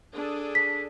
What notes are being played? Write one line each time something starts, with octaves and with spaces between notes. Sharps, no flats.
D4 G#4 A4
B6